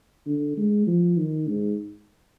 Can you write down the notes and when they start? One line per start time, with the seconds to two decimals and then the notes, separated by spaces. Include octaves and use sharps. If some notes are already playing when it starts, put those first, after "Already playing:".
0.26 D3
0.57 G#3
0.87 F3
1.18 D#3
1.48 G#2